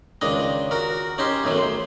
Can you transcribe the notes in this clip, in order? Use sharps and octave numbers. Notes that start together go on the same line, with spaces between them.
C#2 D#3 D4 D#5
F#4 A#4
C#4 D#4 G4 C5
B1 F#2 D#3 F#3 A3
C5